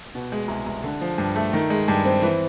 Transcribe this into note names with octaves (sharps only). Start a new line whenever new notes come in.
B2
G#3
C2
C2
D3
F3
G2
A3
D#3
G#3
G2
C4
E3